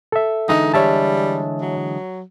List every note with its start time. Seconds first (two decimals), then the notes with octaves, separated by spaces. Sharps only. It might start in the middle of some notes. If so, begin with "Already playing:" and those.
0.12 A4 E5
0.49 D3 E3 G#3 D#4
0.74 G3 C#5 E5 A5
1.61 F#3